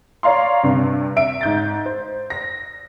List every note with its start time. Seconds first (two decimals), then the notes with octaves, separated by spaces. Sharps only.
0.23 C#5 D5 F5 A#5 C6
0.63 G2 C3
1.16 E5 D7
1.41 G#2 G6 A6
1.86 C5
2.30 A#6